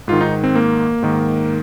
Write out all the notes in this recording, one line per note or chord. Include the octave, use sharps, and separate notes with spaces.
G#2 D#3 F4
D#4
C4
A#3
G#2 D#3